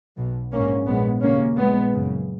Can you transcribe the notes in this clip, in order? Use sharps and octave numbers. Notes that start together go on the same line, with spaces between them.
B1 B2
A#1 G#2 A#3 C#4
A#1 G#2 G#3 B3
D#2 C#3 A#3 C#4
A#1 A#2 G#3 B3
F#1 F#2 C#3